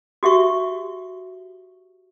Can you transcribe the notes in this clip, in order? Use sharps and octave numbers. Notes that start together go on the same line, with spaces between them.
F#4 G4 E5 C#6